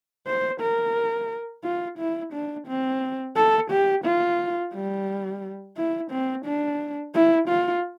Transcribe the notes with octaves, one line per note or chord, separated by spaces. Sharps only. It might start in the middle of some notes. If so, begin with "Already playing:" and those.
C5
A#4
F4
E4
D4
C4
A4
G4
F4
G3
E4
C4
D4
E4
F4